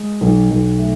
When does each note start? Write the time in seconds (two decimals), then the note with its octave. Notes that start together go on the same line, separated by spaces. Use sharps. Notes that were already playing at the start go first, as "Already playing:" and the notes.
Already playing: G#3
0.21 B1
0.51 B1
0.79 A3